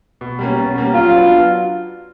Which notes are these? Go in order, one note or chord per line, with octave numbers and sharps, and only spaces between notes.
B2
G3 A#3 C#4
B2
G3 A#3 C#4
F#3 F4
B3 D4
F#3